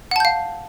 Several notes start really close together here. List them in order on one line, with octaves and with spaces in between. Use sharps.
F#5 A5 G6 F5